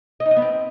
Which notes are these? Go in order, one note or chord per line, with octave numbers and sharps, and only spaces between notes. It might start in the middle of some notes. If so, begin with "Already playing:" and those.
D#5
D#4
D#5
B3
C4